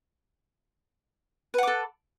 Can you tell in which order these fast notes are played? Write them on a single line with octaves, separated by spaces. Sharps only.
B4 F#5 D6 A4